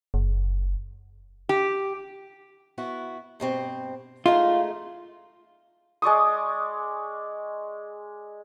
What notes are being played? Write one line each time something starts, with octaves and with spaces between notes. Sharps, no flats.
F#1
G4
B3 E4 F#4
G2 B2 C4
G#3 A3 D#4 F4
G#3 D5 C#6 D#6